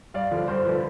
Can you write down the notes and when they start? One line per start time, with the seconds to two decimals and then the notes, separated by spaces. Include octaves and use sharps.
0.14 G2 D5 F5
0.31 D3 F3
0.48 G2 C5
0.65 D3 F3 B4